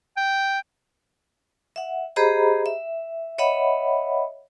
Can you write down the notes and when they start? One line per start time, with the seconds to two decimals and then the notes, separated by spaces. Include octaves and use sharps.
0.17 G5
1.76 E5 F#5
2.16 G4 G#4 C5 D#5 A#5 B5
2.66 E5
3.38 C#5 D#5 E5 F#5 B5